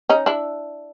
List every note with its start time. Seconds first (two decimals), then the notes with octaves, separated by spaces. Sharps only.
0.09 C#4 D#4
0.26 D4 E4